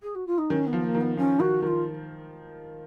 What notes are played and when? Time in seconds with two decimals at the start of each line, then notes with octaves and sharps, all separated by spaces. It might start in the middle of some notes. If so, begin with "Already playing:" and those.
0.02 G#4
0.15 F#4
0.27 F4
0.38 D#4
0.50 D#3 C#4
0.67 B3
0.73 F3
0.83 A#3
0.95 D#3
1.01 B3
1.17 F3 C#4
1.40 D#3 F#4
1.62 D#3 F4 F#4